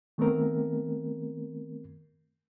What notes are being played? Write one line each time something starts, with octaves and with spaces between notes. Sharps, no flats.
D#3 A3 B3 C4 A#4